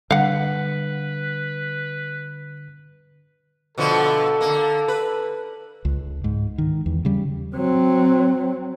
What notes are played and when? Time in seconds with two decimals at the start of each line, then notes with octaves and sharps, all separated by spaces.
0.11 D3 G3 B4 F5 F#5
3.78 B2 D3 F3 A4
4.41 D3 A#3
4.88 B4
5.85 C#2
6.24 G#2
6.58 D#3
6.86 E2
7.05 C#3 G3
7.55 F#3 C4